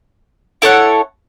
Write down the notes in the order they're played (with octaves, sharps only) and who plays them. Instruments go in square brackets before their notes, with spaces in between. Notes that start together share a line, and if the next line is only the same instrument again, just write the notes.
[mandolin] E4 A4 C#5 F#5